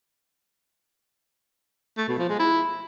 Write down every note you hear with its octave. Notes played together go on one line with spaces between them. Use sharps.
A3
B2
F3
G#3
E4